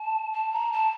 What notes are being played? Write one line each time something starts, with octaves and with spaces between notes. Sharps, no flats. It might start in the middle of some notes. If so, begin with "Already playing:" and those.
Already playing: A5
A5
A#5
A5